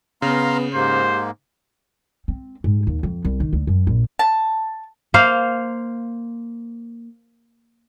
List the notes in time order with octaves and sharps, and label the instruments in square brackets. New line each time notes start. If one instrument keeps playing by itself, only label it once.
[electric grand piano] C#3 [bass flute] B3 [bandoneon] F5 A#5 C6
[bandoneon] G#2 A#3 [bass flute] G4 [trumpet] C5
[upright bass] C4
G#2
D#2
F2
C2
D#3
D2
F#2
A#1
[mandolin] A5
[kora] A#3 C5 F5